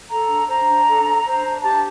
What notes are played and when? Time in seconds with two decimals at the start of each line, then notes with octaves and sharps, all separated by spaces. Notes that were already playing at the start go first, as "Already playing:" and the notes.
0.09 A4 A#5
0.29 D4
0.48 C5 A#5
0.68 D4
0.87 A4
1.06 D4
1.25 C5
1.44 D4
1.63 G4 A5